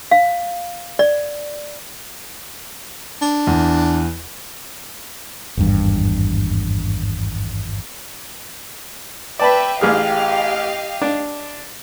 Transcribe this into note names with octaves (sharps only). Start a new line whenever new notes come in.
F5
D5
D4
E2
G#1 E2 G2
B4 D5 E5 G5 A5 B5
A1 G4 G#4 D#5 F5 F6
D4